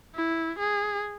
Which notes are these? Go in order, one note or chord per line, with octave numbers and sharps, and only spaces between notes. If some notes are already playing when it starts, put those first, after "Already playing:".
E4
G#4